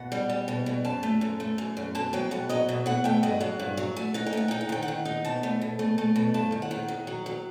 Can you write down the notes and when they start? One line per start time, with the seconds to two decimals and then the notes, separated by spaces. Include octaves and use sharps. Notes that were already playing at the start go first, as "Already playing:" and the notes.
Already playing: B2 F#5
0.12 G3
0.30 G3
0.48 B2
0.66 B2
0.85 F#2 A5
1.03 A3
1.21 F#2
1.40 A3
1.58 F#2
1.77 F#2
1.95 B2 A5
2.13 F#3 G5
2.31 B2 F#5
2.49 F#3 D#5
2.69 B2 E5
2.86 B2 F#5
3.04 A3 G5
3.23 G2 D#5
3.41 F#3 F#5
3.60 G2
3.77 F#3
3.96 A3
4.14 D#4 F#5
4.26 G5
4.33 A3 F#5
4.48 D#4 G5
4.61 F#5
4.69 D#3 G5
4.82 F#5
4.88 D#3
5.05 D#4
5.25 B2 A5
5.43 A3
5.61 B2
5.79 A3
5.98 A3
6.16 B2
6.34 G2 A5
6.52 D#3
6.62 F#5
6.71 D#3
6.88 D#3
7.07 F#3
7.26 F#3